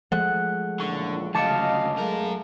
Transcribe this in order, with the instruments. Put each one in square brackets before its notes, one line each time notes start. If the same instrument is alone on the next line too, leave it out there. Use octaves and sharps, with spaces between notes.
[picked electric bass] F3 G#3 A3 [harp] F#5
[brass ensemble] C#2 A#2 E3 [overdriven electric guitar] D3 [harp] C#6
[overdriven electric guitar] D2 C#3 [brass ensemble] F#3 D#5 F5 [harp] A5 D6 C#7
[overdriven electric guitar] F#2 A#4 [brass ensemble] G#3 A3 F5